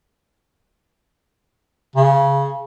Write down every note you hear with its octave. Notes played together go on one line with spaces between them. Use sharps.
C#3